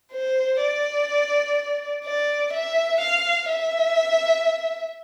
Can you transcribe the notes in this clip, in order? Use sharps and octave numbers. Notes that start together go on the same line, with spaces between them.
C5
D5
D5
E5
F5
E5